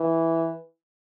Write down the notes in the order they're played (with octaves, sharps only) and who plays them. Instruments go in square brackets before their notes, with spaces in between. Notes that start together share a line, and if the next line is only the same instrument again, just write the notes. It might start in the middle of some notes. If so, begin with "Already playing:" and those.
Already playing: [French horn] E3